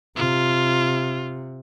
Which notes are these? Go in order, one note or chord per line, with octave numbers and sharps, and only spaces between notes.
C3 F4